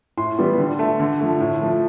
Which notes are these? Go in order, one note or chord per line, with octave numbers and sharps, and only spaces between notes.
A2 C6
E3 G3 B3
D3
A3
D3
F3 A3
A2
F3 A3